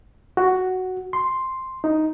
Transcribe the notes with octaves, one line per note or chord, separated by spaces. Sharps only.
F#4
C6
D#4